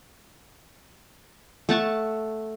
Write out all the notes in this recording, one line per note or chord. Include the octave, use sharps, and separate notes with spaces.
A3 F#5 A5 C#6